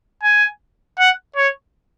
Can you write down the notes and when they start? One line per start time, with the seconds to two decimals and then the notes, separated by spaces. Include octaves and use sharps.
0.23 G#5
0.99 F#5
1.36 C#5